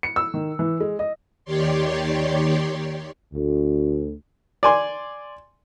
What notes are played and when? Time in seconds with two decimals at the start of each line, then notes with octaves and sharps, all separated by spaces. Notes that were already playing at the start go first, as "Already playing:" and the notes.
0.03 C#7
0.16 E6
0.34 D#3
0.59 E3
0.80 G#3
0.99 D#5
1.45 D#2 D#3 G4 C#5 D5 C6
3.34 D2
4.63 D5 G#5 C6